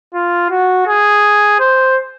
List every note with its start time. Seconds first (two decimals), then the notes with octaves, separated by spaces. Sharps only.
0.14 F4
0.50 F#4
0.87 G#4
1.59 C5